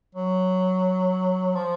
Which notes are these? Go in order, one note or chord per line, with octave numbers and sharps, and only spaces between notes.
F#3
F3